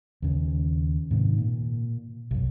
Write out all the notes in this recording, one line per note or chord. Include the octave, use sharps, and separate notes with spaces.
D#2 C#3
G#2 C3 D#3
A#2
B1 F#2